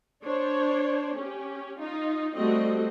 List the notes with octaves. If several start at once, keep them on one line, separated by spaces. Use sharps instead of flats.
D4 C5 C#5
C#4 G4
D#4 F4
G3 A3 C4 F#4 A4 D#5